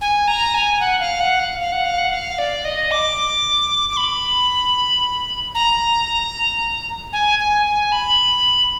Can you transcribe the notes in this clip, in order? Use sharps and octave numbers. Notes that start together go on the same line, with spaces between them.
G#5
A#5
G#5
F#5
F5
F#5
F5
F5
F#5
F5
F#5
F5
D5
D#5
D6
D6
B5
A#5
G#5
G#5
G#5
B5